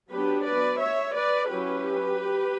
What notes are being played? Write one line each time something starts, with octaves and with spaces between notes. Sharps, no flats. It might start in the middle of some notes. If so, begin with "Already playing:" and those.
F#3 B3 D4 G4 B4
B4 D5
C#5 E5
B4 D5
F#3 C#4 E4 G4 B4